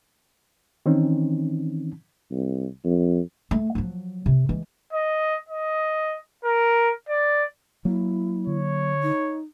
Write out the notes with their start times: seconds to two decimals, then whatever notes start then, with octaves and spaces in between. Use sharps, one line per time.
0.86 D#3 E3 C4 C#4 D#4
2.31 C2
2.85 F2
3.51 A3
3.75 F3 F#3
4.26 C3 C#4
4.49 E3 G#3
4.93 D#5
5.49 D#5
6.45 A#4
7.09 D5
7.85 F#3 A#3 E4
8.47 D3 C#5
9.03 D#4